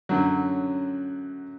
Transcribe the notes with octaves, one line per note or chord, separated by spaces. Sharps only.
F#2 D3 F#3